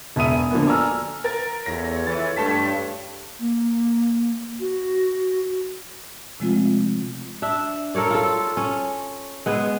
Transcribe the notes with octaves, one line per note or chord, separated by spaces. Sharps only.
E1 B3 E5 D#6 D#7
D3 F3 A#3 B3
A4 D5 G#5 A#5 E6 F6
A#4 A6
E2 F4 A4 C#5 A#6
E3 A6
G2 A3 A5 B6
A#3
F#4
C3 F3 G#3 A3 C4 F4
D4 E5
A4 A#4 C#5 D5
F4 A4
C#4
G#3 B3 G#4